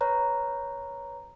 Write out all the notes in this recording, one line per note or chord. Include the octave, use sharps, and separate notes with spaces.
B4 C#5 A#5 F#6